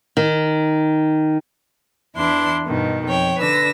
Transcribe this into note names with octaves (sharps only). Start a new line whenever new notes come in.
D#3
E2 E3 D4 E4 C6
G2 B2 D#3
F2 C#5 G5
D3 D4 B4 E6 A#6